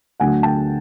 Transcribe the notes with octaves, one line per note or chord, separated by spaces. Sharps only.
D2 D3 F#3 A3 F#5 G#5
G5 A5